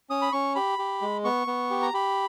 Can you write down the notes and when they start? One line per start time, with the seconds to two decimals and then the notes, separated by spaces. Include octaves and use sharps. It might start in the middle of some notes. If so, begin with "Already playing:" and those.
0.10 C#4 D#6
0.22 B5
0.32 C#4 C#6
0.55 G4 B5
0.79 G4
1.01 G#3
1.24 B3 C#6
1.47 B3
1.70 G4
1.82 A#5
1.93 G4 B5